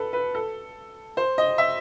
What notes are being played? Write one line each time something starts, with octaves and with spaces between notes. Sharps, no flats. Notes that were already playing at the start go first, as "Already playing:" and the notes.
Already playing: A4 B4
B4
A4
C5
D#5
E5